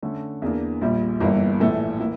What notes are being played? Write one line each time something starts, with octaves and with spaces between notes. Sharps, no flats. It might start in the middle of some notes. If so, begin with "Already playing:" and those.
D3 A3 C#4
E2 E3 A#3 D4
A#1 A#2 G3
G1 G2 E3 A#3
A#1 A2 E3 A3
E3 A#3 E4